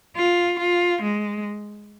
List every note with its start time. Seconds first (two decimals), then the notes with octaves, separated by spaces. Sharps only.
0.17 F4
0.59 F4
1.02 G#3